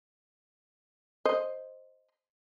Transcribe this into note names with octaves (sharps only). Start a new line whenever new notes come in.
C5 D#5